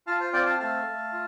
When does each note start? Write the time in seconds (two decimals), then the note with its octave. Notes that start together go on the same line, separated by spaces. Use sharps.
0.07 F4 F5 A5
0.20 C5 F5
0.33 C4 D5 G5
0.46 F5 A5
0.60 A3 F5 A5
0.86 A3
1.12 F4